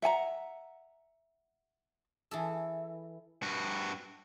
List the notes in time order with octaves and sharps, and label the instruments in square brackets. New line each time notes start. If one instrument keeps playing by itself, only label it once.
[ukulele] E5 F#5 G#5 A#5
[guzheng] E3 G#4 A4
[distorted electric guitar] G2 F#4